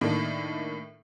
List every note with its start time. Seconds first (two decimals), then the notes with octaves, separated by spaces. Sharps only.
0.01 A2 D#3 A#3 D4 A4